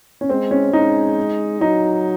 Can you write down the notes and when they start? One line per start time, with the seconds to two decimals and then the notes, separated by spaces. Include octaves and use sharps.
0.21 C#4
0.29 G#3 C4
0.51 C#4
0.73 G#3 D#4
1.61 F#3 D#4